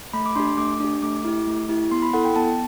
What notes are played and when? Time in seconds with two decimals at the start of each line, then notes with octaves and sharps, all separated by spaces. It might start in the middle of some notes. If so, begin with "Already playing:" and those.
0.13 A3 B5
0.26 D6
0.36 D4 G4 C6
0.58 A3 D6
0.80 D4 G4
1.03 A3 D6
1.25 E4 G4
1.47 A3
1.69 E4 G4
1.91 B3 C6
2.02 B5
2.13 E4 A4 F#5
2.25 G5
2.36 B3 A5